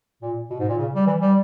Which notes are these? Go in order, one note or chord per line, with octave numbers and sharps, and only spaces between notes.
A#2
B2
G#2
A#2
C#3
G3
E3
G3